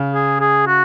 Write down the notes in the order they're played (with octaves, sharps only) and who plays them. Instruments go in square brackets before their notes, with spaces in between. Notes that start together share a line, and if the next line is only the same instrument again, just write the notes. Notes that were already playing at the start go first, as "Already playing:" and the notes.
Already playing: [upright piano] C#3
[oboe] G#4
G#4
F#4